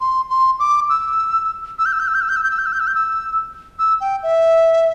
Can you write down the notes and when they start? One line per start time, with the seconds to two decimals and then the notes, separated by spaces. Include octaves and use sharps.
0.01 C6
0.30 C6
0.59 D6
0.90 E6
1.79 E6
1.86 G6
1.93 E6
2.00 G6
2.08 E6
2.15 G6
2.21 E6
2.29 G6
2.36 E6
2.44 G6
2.51 E6
2.59 G6
2.66 E6
2.73 G6
2.80 E6
2.87 G6
2.95 E6
3.79 E6
4.01 G5
4.23 E5